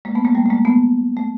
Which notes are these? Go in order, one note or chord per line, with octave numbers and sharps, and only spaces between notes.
G#3 A#3
A3 B3
G#3 A#3
G3 A3
A3
G#3 A#3
A3 B3
A3